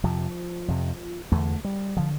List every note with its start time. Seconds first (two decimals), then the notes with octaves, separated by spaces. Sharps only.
0.04 F2 C3 F3
0.68 F2 C3
1.32 E2 D3 A3
1.65 G3
1.97 D3 F3